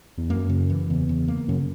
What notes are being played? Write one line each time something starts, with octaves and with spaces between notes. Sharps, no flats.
E2
F#2 A#3
C#3
E3
E2 C#3
C#3
A#3
F#2 C#3